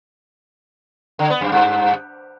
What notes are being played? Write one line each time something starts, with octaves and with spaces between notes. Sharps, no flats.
D3
B3
F#2
G2